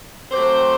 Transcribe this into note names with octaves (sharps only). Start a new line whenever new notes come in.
F#3 A3 C4 G4 C5